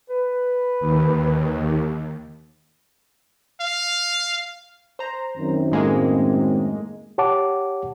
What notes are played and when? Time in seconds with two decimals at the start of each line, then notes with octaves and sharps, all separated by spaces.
0.10 B4
0.80 D#2
3.61 F5
4.99 C5 A#5
5.37 F#2 D#3 C4
5.72 A2 G#3 A#3
7.18 G4 C#5 F#5 A5 D6